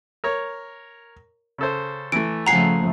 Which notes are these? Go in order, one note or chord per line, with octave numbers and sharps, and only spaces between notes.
A#4 C#5
C#3 A4 C5
E3 A3 D7
C#3 F3 A3 F#5 G#5 A#5 C7